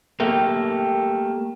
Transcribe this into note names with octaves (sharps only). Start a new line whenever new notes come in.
A3 A#3 G4